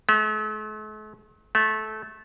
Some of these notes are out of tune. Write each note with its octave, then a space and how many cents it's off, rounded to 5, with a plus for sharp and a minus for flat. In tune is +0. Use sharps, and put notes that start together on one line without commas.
A3 -45
A3 -20